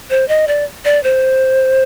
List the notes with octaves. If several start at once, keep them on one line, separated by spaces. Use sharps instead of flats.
C5
D#5
D5
D5
C5